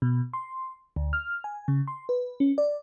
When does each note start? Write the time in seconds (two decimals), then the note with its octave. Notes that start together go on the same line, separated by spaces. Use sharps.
0.02 B2
0.33 C6
0.96 D2
1.13 F6
1.44 G#5
1.68 C#3
1.88 C6
2.09 B4
2.40 C#4
2.58 D5